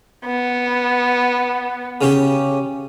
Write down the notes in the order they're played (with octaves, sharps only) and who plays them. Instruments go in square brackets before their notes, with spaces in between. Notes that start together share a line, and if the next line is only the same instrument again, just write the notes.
[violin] B3
[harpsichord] C#3 C#4 G4